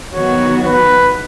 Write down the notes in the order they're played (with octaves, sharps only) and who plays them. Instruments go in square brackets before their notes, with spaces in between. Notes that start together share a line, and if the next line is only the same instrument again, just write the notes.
[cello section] D#3 F#3 B3 F#4 [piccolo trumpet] C#5
[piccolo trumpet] B4